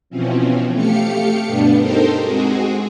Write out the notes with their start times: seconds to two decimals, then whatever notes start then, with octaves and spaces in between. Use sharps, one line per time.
0.10 B2 E3 F3 C4 C#4
0.72 A3 G4 F5 C#7
1.46 G2 B2 B3 D4
1.77 D#4 G4 A4 A#4 C5
2.22 G#3 C4 F#4 G#4